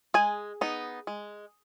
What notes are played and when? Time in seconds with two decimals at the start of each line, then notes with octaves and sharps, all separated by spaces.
0.14 G#3 G#4 G#5
0.61 B3 D#4
1.07 G#3